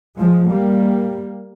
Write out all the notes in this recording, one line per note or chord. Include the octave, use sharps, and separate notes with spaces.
F3 G#3
G3 A#3